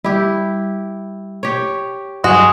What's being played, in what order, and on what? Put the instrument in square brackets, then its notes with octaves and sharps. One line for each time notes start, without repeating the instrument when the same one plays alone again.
[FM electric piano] G3 [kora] E4 G4
[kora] G4 C#5
[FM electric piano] G2 F#3 [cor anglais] G#3 [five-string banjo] F#4